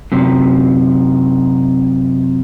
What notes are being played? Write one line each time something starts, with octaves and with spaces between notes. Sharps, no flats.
F#2 C3